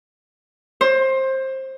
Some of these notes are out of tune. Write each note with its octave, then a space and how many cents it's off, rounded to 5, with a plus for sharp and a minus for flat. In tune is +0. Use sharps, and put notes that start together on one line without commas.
C5 +20